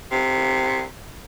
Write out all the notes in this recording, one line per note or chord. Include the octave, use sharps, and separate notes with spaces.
C3